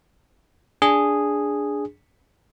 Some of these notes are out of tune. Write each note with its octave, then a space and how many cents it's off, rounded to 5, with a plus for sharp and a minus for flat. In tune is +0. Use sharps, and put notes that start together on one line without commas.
D4 -10 G#4 -5